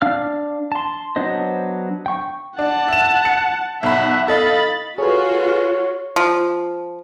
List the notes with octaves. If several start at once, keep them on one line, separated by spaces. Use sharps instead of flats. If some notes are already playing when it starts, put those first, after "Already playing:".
D4 F5 F6
A5 C6
F#3 B3 D4 C5 D#5
G5 C#6
D4 F#5 A5
E5 E7
C#7
B1 E5 F#5 B5
A4 D#5 F5 B5 A6
F4 F#4 G#4 A4 B4 C#5
F3